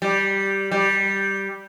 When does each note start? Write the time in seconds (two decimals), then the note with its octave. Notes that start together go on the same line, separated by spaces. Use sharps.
0.02 G3
0.72 G3